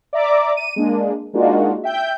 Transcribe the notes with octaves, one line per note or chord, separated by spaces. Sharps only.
D5 E5 A#5 D6
D#7
G#3 A#3 D4
G#3 A#3 D4 D#4 F4 F#4
E5 G5 G6